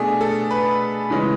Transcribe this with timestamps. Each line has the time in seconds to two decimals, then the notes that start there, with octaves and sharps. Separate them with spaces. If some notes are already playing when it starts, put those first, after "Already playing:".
Already playing: B2 A3 D4 G#4
0.21 A4
0.51 B4
1.10 C#3 E3 G#3 C#4